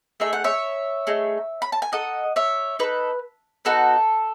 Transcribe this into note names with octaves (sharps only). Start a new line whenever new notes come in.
A3 D#4 G#4 E5
F#5
C#5 E5
A3 D#4 G#4
B5
A5
G#5
D#4 A4 D#5 F#5
C#5 E5
D#4 A4 B4
B3 D#4 F#4 A4